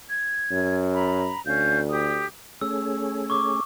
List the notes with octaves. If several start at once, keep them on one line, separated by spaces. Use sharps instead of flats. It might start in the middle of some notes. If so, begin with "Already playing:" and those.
G#6
F#2
A#5 B5
D2 C#4 F5 G6
G4 D#6
A3 C#4 G#4 E6
C#6 D6